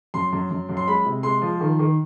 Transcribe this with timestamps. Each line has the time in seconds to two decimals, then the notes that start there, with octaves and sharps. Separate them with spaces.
0.14 F#2 C6
0.32 F#2
0.51 F#2
0.69 F#2
0.77 C6
0.87 G#3 B5
1.06 C3
1.23 G#3 C6
1.42 F3
1.61 D#3
1.79 D#3